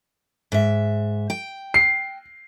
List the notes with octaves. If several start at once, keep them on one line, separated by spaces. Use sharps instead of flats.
G#2 E5
G5
C7